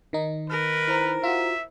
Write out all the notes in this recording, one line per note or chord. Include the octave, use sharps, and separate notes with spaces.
D#3 D#4
A#4 B4 F6
E4 C5 A#5
F4 F#4 E5